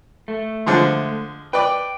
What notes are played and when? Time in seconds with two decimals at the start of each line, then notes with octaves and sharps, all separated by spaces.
0.28 A3
0.66 D3 F3 G#3
1.53 B4 D5 G5